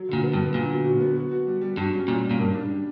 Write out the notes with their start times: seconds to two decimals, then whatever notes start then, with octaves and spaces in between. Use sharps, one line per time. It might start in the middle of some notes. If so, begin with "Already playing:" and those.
Already playing: F#3
0.09 A#2 D3
0.24 B3
0.34 G2
0.39 B3
0.54 A#2 D3
0.69 F#3
0.84 F#4
1.01 B3
1.16 F#4
1.32 F#4
1.47 G3
1.61 G3
1.77 G2 F#4
1.93 C#4
2.08 A#2 G3
2.24 G3
2.31 A#2
2.39 G2 A#3
2.54 D4
2.70 G3